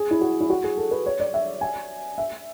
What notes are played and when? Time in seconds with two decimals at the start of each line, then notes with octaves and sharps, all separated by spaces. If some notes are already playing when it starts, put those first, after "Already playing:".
Already playing: G#4
0.11 E4
0.21 F#4
0.41 E4
0.50 F#4
0.64 G#4
0.77 A4
0.91 B4
1.06 C#5
1.20 D5
1.34 E5
1.61 G#5
2.18 E5